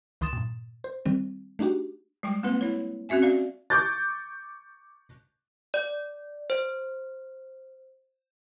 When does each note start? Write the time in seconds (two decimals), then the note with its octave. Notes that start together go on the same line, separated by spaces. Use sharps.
0.21 C#2 D#3 C6 D#6 A6 E7
0.33 G2 A#2
0.84 C5
1.06 D#3 G3 C4
1.59 A3 D4 D#4 F#4 G4
2.23 G3 G#3 G5 C#6
2.43 A#3 C4 F4 B4
2.61 E4 C#5
3.09 C4 C#4 F#4 E5 G#5
3.22 F#4 D5 F5
3.70 C#6 D6 G6 A6
5.74 D5
6.50 C5